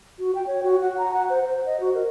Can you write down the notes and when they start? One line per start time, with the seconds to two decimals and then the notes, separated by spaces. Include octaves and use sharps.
0.19 F#4
0.35 G5
0.47 C#5
0.63 F#4
0.81 F#5
0.98 A#5
1.14 F#5
1.30 C5
1.45 C5
1.66 D#5
1.80 F#4
1.94 A#4